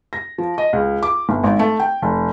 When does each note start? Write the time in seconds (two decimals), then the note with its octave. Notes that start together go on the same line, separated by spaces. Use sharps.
0.13 A#6
0.38 F3
0.58 D#5
0.73 C#2
1.03 D6
1.29 G1
1.44 G#1
1.59 A3
1.80 G5
2.02 F1